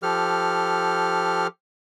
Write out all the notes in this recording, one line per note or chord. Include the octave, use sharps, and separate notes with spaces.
F3 G4 A4 F6